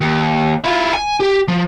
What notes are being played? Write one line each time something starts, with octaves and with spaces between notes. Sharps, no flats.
D#2
E4 F4
G#5
G4
F3